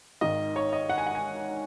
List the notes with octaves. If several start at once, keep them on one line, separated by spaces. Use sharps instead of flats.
G#1 G#2 D#3 D#5
C#5
D#5
F#5
G#5
F#5
G#5